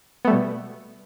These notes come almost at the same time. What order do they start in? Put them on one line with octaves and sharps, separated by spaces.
B3 A3 G3 B2